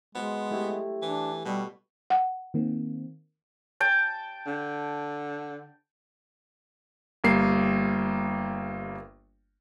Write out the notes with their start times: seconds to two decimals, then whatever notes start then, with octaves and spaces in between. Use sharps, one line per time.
0.15 G#3 B3 F#4 C5
0.50 A3 E4 G4
1.02 E3 D4
1.45 B2 G3 C#6 E6
2.10 F#5
2.54 D#3 A#3 C4
3.80 G5 A5
4.47 D3
7.24 G1 G3 A#3 C7